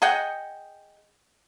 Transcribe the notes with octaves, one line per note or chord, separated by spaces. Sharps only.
G#4 D#5 F#5 G5